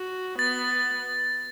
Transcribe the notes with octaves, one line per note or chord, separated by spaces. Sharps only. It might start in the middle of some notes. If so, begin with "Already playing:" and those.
Already playing: F#4
B3 A6